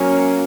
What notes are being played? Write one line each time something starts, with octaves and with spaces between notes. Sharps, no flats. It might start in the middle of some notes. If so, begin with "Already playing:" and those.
Already playing: F#3 A#3 C#4